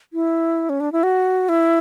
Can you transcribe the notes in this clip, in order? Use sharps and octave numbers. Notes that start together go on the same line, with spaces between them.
E4
C#4
D4
E4
F#4
E4